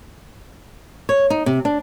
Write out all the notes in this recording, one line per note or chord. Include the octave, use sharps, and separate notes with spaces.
C#5
D#4
C3
D4